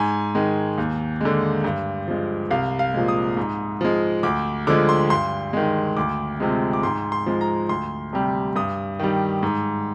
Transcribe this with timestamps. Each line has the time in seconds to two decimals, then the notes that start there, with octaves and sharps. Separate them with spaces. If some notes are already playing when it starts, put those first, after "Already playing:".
Already playing: G#2 G#5
0.35 D#3 G#3
0.78 D#2
1.21 D3 G#3
1.64 G2
2.08 F3 G#3
2.51 C2 F5
2.79 F5
2.94 A#2 F3 G#3
3.08 D#6
3.37 G#2
3.81 F3 G#3
4.23 D2 D6
4.67 D3 F3 G#3 D6
4.89 C6
5.10 G2 C6
5.53 D#3 G#3
5.97 D2 D6
6.40 C3 F3 G#3
6.73 D6
6.83 G#2 C6
7.12 C6
7.26 F3 G#3
7.41 A#5
7.69 D2 C6
8.13 C3 G3
8.56 G2 D#6
8.99 D#3 G3
9.43 G#2